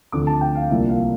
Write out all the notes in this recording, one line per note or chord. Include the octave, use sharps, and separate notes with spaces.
D2 D3 F3 C4 D6
A5
G5
F5
C2 C3 F3 A#3 E5
F5